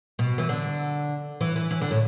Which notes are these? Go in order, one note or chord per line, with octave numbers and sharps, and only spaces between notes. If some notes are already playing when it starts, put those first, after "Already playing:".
B2
E3
D3
E3
E3
E3
D3
A2